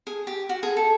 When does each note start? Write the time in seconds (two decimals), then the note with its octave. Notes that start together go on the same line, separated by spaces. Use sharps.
0.07 G#4
0.27 G4
0.49 F#4
0.63 G#4
0.77 A4